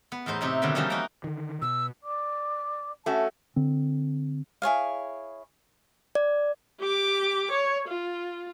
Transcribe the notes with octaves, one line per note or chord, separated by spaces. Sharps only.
B3
E2 A2 D#4 C5
C3 D#4 E4
B2 D3 D#3 F#3 G3
E3 F3 G3 A3 C#4 D#4
A#3 D#4 F#4
D3 D#3
B2 E6
D5 D6
A3 C#4 F#4 A5
D3 C4
E4 G#4 C#5 F5
D5
G4 D6
C#5
F4